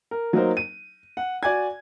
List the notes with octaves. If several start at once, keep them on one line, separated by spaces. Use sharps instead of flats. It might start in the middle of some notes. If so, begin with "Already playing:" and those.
A#4
F#3 A#3 D#4 A#4 C5
D#7
F#5
F#4 D5 G#5 G#6